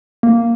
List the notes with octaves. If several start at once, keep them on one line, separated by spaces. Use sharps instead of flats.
A#3